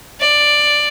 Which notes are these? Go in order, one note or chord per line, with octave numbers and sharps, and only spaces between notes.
D5